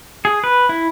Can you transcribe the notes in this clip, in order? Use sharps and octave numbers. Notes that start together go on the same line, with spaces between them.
G#4
B4
E4